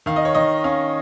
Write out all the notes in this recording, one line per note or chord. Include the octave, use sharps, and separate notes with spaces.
D#3 F5
D#5
C#5
D#3 D#5
C#4 F5